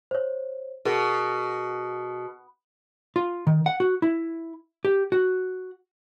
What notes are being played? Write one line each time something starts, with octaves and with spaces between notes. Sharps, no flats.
C5 C#5
B2 G#4 A#4
F4
D#3
F#5
F#4
E4
G4
F#4